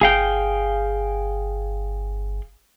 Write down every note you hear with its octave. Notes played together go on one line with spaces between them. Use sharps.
G1 G#4 F5 G5